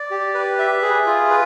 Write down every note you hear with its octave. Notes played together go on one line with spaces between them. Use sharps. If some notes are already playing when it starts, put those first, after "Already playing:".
Already playing: D5
G4
B4
E5
G#4
F4
B4